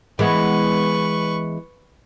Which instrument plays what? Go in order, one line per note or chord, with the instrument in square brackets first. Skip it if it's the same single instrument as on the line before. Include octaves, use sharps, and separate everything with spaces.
[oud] E3 G#3 B3 [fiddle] B4 C#6